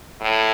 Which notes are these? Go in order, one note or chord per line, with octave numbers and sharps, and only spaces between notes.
A2